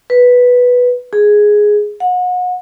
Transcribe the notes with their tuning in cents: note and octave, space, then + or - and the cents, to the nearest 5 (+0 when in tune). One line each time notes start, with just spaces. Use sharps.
B4 -5
G#4 +5
F#5 -35